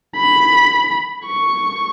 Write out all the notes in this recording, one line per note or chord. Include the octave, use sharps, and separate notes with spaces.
B5
C#6